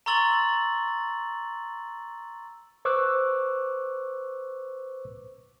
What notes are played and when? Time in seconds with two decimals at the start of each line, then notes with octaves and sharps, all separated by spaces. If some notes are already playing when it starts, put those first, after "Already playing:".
0.06 A#5 C6 C#6 E6 A6 F#7
2.85 B4 C5 C#6 D6 E6 F#6